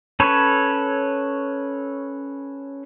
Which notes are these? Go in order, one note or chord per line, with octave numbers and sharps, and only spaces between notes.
C#4 A4 B4 C#5